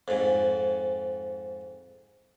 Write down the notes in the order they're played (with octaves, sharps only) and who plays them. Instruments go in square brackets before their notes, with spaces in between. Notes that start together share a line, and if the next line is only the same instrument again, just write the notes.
[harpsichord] F2 G#2